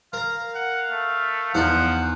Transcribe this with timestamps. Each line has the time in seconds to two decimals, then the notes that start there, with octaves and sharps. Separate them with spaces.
0.13 A#4 F5 A#5
0.55 F#5
0.91 A3
1.55 E2 F3 D#4 F4 C5 F#5